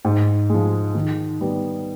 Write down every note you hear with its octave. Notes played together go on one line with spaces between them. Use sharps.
G#2
F3 G#3
D#3
G3 B3